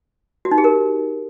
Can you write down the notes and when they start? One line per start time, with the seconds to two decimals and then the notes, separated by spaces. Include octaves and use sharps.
0.45 F#4
0.51 D#4
0.58 G4
0.64 A#4